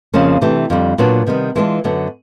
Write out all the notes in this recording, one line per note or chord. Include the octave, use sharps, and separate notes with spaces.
F2 C#3 F3 A#3 C#4
C3 E3 A3 D4 G4
F2 D3 G3
A#2 F#3 B3 D4 F#4
C3 D#3 G3 B3
E3 G#3 B3 D4 F4
F#2 D3 F#3 B3